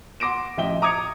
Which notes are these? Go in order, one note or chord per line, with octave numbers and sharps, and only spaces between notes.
F#5 C6 D6 A#6 D7 E7
A1 F3 D#5 E5 G5 G7
A#5 D6 D#6 G#6 C#7 F7